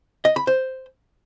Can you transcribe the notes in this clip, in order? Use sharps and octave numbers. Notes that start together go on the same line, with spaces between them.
D#5
B5
C5